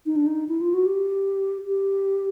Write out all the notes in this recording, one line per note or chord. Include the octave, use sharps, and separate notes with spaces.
D#4
D4
D#4
E4
F4
F#4
G4
G4